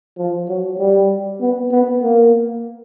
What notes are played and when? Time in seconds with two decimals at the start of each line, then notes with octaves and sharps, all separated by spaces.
0.18 F3
0.48 F#3
0.79 G3
1.41 B3
1.71 B3
2.03 A#3